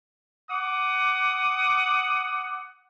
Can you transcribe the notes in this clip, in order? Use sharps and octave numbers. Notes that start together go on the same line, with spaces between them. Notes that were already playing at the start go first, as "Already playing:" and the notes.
F#5 D6 D#6